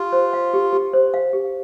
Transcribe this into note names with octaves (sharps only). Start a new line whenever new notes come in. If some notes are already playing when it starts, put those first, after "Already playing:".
Already playing: F4 G4
C5
F5
G4
G4
C5
F5
G4